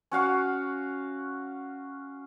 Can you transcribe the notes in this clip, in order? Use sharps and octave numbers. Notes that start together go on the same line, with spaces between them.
C#4 F#4 F5 F#5